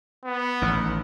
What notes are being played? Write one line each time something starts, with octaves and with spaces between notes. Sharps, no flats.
B3
A1 D#3